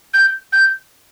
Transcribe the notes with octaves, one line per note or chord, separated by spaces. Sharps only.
G6
G6